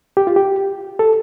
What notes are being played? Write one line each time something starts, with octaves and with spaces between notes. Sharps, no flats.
G4
F4
G4
A4